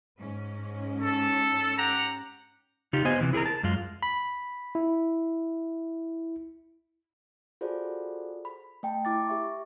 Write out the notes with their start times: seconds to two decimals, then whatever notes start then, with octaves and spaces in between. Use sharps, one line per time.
0.19 G#2 C#4
0.99 A4
1.77 G4 F#5 A#5
2.93 C#3 D#4 F4 G4
3.05 B3 C5 D#5 G#5
3.21 C3 E3
3.33 E4 G#4 A#4 A#5
3.46 A5
3.63 F#2 G#3 F4
4.03 B5
4.75 E4
7.61 F4 F#4 G#4 A4 C5 D5
8.45 B5
8.83 A3 G5 A5
9.05 E4 D6 A6
9.28 G4 E5 C#6